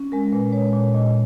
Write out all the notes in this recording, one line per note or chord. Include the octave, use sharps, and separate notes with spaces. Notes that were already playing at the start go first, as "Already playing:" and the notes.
Already playing: C#4
G#3 A#4
A#2 B4
G#3 C#5
A#2
A#2 D#5